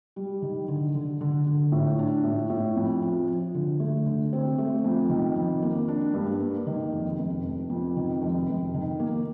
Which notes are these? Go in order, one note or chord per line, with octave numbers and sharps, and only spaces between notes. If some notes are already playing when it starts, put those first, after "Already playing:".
G3
D#3
D3
D3
D3
D3
A2
D4
A2
A2
F2
F3
F3
D3
A3
D3
C4
A3
F2
D#3
F2
A#3
D4
G2
A#3
D#3
F1
F1
F1
F2
D#3
F1
F1
D#3
A#3